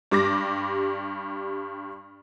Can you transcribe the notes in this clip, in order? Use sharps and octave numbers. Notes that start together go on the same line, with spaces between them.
G2 G3 D6 A#6